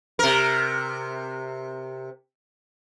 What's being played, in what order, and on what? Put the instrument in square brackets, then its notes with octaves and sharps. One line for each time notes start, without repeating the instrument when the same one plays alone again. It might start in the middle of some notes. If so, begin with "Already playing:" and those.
[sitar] C3 A#4